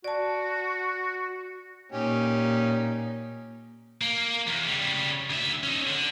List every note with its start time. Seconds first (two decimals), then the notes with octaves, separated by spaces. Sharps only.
0.04 F#4 D5 A5
1.92 A#2 C#4 D#4 G4
4.01 A#3
4.47 E2
4.67 C#3 G3
5.30 D2 E5
5.63 C#4 D#4
5.87 D3